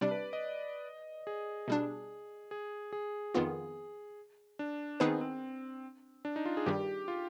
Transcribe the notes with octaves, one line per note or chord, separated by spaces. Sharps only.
C3 G3 D4 D5
B4
D#5
G#4
B2 G3 D4
G#4
G#4
F2 D#3 B3 F4
D4
D#3 B3 C4 D#4 G#4 B4
C4
D4
D#4
F4
G#4
G2 D#3 G3 G4
F4